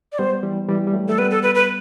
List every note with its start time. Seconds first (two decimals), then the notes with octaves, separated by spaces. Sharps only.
0.12 D5
0.19 G3 B3 C5
0.43 E3 G3
0.68 E3 G3
0.87 G3
0.94 F#3 A3
1.08 A3 A4
1.18 G3 B3 B4
1.31 A4
1.43 B4
1.55 B4